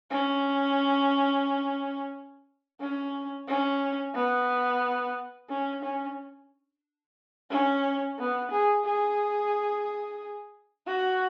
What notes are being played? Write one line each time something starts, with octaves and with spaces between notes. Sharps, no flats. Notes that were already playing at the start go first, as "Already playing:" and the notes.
C#4
C#4
C#4
B3
C#4
C#4
C#4
B3
G#4
G#4
F#4